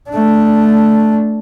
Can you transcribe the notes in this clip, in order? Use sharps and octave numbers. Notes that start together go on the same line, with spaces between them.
A3 D4